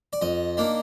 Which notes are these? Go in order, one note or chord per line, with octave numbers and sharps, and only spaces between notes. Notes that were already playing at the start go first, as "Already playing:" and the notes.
D5
F2 D#5
D#3 A#3 D4